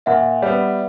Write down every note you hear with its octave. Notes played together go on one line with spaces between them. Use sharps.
A#2 E5 F#5
G3 B3